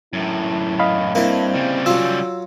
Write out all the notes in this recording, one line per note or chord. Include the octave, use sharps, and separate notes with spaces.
F#2 A2 E4
D#5 F5 B5
G2 A#3 C4 E4
C#3 G3
F#3 F4 E6